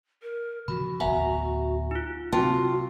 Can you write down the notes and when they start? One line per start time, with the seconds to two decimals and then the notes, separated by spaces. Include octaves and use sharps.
0.22 A#4
0.68 C#3 E3 F3 F#4 B5
1.00 D1 G1 B3 E5 F#5 G#5 A#5
1.91 D#4 F4
2.32 C3 F#3 C4 F4 F#4 G5 A5